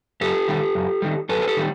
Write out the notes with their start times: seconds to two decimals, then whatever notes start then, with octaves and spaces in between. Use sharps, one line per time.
0.21 F#2 G4 A4
0.48 D#3 G3
0.75 F#2
1.02 D#3 G3
1.29 F#2 A4 B4
1.42 G#4
1.48 G4 A4
1.57 D#3 G3